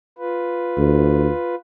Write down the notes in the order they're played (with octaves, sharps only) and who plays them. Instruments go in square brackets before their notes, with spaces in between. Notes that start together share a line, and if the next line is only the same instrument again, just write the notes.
[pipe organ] F4 B4
[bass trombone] D2